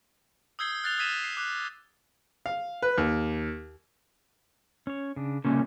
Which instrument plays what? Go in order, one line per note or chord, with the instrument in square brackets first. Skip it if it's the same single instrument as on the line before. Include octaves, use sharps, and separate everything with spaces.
[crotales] D#6 E6 G6 G#6 C7 G7
F6 F#6 A6 C7 F7 G7
D#6 E6 G#6 B6 D#7 E7
C7
D6 F#6
[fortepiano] F5
B4
D#2
[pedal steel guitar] C#4 C#5
C#3 D4
[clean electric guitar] C2 A#2 C#3 [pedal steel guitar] A#3 C#4 A4